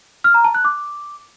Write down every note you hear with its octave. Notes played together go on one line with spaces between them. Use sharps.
F6
A#5
A5
F#6
D6